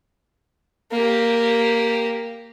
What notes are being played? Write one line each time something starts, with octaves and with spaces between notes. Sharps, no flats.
A#3 G4